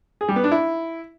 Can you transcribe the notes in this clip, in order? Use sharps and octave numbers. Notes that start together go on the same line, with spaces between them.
G#4
G3
B3
D4
E4